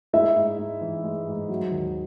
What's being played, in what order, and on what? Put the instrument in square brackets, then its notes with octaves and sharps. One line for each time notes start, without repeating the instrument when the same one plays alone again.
[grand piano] G#3 [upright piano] E4 E5
[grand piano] G#2
G#2
E3
G#3
G#2
F#3
D#2